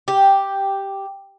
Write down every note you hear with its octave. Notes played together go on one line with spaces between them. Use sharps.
G4